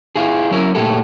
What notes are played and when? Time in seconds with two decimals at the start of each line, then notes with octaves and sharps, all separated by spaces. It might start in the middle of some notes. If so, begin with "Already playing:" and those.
0.16 E4 F4 G#4
0.51 F#3 C#4 E4 A#4
0.75 A#2 G#3 A3 G4 A4